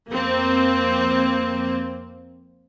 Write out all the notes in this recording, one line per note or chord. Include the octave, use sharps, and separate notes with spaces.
F2 A#3 C4